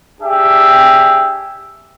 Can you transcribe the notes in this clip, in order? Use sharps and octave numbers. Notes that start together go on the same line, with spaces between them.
D4 G4 G#4 E5